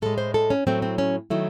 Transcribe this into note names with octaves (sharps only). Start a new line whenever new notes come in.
A2 G#3 A4
C5
A4
C#4
A2 F#3 A3 C4
C4
C#4
D#3 F#3 A3 E4